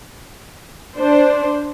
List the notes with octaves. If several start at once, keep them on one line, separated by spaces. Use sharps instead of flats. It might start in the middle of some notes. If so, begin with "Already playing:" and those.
D4 C5